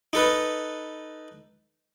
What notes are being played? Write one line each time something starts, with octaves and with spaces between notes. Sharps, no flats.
D#4 A4 B4